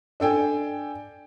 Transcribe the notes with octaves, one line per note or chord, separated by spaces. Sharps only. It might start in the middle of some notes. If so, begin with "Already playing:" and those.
D4 A4 G5 G#5